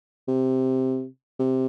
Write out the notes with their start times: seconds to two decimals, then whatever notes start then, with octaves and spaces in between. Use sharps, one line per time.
0.28 C3
1.39 C3